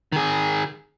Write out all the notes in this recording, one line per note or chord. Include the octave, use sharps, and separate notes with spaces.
D#3 G#4